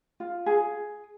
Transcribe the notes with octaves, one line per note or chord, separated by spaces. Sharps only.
F4
G#4